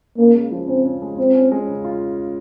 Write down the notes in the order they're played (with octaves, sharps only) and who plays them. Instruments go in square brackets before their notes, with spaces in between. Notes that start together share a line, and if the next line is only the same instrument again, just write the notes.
[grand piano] C#3 [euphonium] A#3
[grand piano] G#3
F3
[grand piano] C#3 [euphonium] C4
[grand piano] C#3
G#3
[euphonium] C4 [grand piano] F4
[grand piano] C#4
G#3
C#3
F4